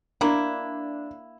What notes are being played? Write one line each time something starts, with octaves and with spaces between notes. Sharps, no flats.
A#3 D4 E4